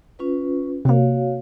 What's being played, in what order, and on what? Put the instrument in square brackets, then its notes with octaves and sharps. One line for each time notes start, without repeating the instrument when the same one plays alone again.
[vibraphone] C#4 F4 B4
[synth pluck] C3 A#3 [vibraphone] F#4 C#5 F5